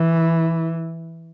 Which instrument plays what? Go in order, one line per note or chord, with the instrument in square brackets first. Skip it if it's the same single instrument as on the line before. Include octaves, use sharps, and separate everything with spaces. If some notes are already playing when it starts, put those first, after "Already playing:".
Already playing: [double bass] E3